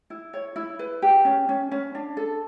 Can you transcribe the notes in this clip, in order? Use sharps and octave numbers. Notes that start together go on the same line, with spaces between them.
E4
C#5
E4
B4
G4
C#4
C#4
C#4
D4
A4